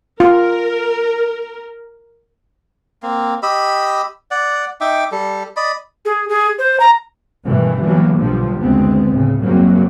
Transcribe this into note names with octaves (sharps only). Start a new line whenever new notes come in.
F4 A#4
A#3 C4
G4 D#5 B5 E6
D5 F#5
D#4 E5 G5 D6
G3 A4
D5 D#5 B5
G#4
G#4
C5
A#5
G2 B2 D#3 E3 A3
D3 E3 F#3 G3 A#3 B3
B1 G2 A#2 D3 F3 G3
F#1 D2 G#3 B3 C4
A2 C#3
F#2 C#3 F#3 G3 A#3 C4